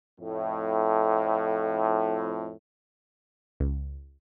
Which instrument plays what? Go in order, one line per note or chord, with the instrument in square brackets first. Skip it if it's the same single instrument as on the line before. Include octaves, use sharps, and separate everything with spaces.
[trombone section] F2 A2
[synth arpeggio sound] C#2